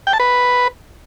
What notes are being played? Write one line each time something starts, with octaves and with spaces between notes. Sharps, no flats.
G5
A5
B4